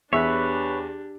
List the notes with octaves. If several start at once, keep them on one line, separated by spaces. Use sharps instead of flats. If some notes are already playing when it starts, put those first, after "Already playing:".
E2 D4 G4 B4 C#5 E5